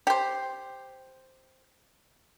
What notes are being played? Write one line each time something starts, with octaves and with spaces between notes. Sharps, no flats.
G4 C5